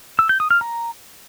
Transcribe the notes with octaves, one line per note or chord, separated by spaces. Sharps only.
E6
G6
D#6
F6
A#5